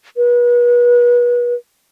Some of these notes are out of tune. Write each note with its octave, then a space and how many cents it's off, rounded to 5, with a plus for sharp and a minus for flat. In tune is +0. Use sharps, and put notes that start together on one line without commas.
B4 -35